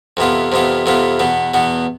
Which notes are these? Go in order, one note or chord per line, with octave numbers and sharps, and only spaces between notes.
F2 C3 E3 B3 F4
F2 C3 E3 B3 F4
F2 C3 E3 B3 F4
E2 B2 B3
E2 B2 B3